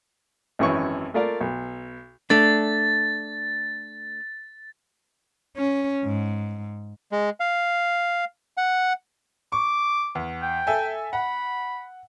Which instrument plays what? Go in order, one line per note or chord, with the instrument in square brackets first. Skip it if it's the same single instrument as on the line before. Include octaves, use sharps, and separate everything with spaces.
[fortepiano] G#1 F#2 E3 C#4 C#6
A3 A#3 F4 A#4 D5 F5
B1
[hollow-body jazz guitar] A3 D4 [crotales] A6
[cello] C#4
G#2
[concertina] G#3
F5
F#5
[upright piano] C#6 [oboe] D6
[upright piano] E2
[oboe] G5
[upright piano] A4 E5 G#5
[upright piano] F#5 [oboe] B5